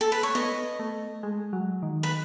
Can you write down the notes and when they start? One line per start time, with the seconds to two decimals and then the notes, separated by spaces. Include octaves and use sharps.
0.01 A4
0.12 B4
0.23 C#5
0.35 B3 D#5
0.79 A3
1.23 G#3
1.53 F#3
1.83 D#3
2.03 B4